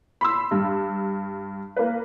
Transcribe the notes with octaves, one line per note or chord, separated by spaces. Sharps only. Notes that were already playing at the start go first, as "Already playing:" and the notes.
B5 C6 E6
G2
A#3 B4